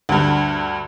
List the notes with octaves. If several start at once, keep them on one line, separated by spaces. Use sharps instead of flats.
D2 G2